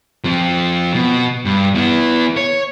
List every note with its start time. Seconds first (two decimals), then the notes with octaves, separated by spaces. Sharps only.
0.24 F3 C4
0.94 B2
1.45 G2
1.75 B3 E4
2.37 C#5